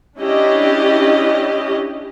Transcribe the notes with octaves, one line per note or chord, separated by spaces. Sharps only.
C#4 D4 E4 G4 D#5